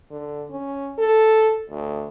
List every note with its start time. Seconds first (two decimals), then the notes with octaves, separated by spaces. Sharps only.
0.11 D3
0.51 C#4
0.98 A4
1.70 D2